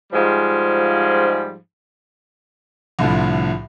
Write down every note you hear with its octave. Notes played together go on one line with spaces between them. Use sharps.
G#2 F3 G3 G#3 F4
C2 A2 D3 F3